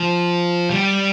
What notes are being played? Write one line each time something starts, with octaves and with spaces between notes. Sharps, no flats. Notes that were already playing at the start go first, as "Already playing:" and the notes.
Already playing: F3
G3